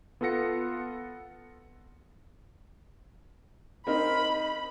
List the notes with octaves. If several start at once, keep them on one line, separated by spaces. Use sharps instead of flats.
B3 F4 A4 F#5 A#6 C#7
C4 D#4 A#4 B5